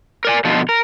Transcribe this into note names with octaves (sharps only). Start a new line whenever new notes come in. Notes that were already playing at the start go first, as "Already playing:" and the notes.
A#4 D5 G#5
B2 D3 F3 D#4 F4
A#4